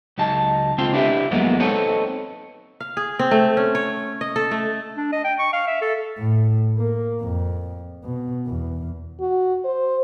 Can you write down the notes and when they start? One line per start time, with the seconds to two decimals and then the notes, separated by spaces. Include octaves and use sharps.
0.18 C#2 F#3 D#4 A5
0.78 C#2 C4 F4 C6
0.94 D4 E4 G4 B4 E5
1.31 F2 E3 F#3 G#3 A#3 B3
1.60 C4 D#4 A4 B4 C#5
2.81 F5
2.97 G#4
3.19 C4
3.31 A3
3.57 C#4
3.75 C#5
4.21 D#5
4.36 A4
4.51 A3
4.97 D4
5.12 D#5
5.24 G5
5.39 C#6
5.53 F5
5.67 E5
5.82 A4
6.19 A2
6.77 A#3
7.21 F2
8.04 B2
8.47 E2
9.21 F#4
9.65 C5